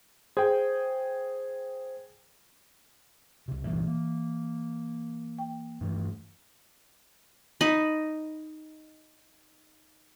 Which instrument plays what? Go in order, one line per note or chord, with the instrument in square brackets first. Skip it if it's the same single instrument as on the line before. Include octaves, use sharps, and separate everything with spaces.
[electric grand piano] G#4 G5 [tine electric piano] C5
[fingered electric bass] C2 C3
[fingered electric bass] C2 G2 A#2 [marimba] E3
[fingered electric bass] A#3
[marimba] G5
[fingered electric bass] G2 E3 A3
[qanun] D#4 D#5 B5